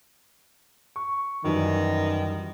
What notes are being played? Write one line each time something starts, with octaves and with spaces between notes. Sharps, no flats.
C#6
F#2 D#3 E3 G3